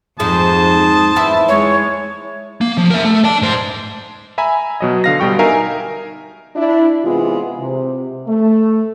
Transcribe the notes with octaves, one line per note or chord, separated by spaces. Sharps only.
F2 G#2 G#3 C5 A5 D#6
E2 C4 E4
G#3 C#5
A#3
F3
A#4 E5
A3
D5 A5
G#2 C5
E5 G#5 A#5 B5
B2 F#3 D#5
D3 F5 A#6
B2 G3 G5 C#6
D#4 A#4 E5 F5 G#5
D4 E4
C3 E3 G#3 B3 F4
C3
A3